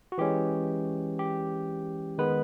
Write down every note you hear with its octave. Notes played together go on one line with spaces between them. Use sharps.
F#4
E3 G#3 C#4 G4
G4
D#3 G#3 B3 B4